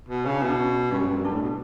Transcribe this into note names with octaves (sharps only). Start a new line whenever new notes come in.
B2
C#3 C#4
D4
B2 E4
D4
C#4
G2 C#4
F#2
G2
F#2
G2 D4
A2
B2